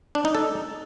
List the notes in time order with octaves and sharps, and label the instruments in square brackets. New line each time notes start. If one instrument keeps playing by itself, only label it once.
[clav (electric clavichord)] D4
D#4
A4